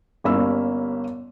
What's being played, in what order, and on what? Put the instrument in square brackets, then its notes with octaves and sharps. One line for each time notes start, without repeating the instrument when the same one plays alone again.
[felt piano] G1 G2 A#3 C#4 B5 E6